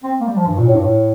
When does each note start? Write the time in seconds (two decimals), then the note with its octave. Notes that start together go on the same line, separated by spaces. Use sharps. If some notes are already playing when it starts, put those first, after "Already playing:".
0.04 C4
0.20 A#3
0.27 G3
0.36 F3
0.47 G2
0.57 A#2
0.66 A2
0.75 G2
0.83 A2